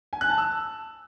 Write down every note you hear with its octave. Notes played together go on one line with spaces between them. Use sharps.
G#5
F#6
A5
E6